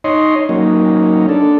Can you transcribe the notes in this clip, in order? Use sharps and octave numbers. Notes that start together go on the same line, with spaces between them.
D#4 C#5 D#5 C6
F#3 A#3 C#4 D#4
D4 A4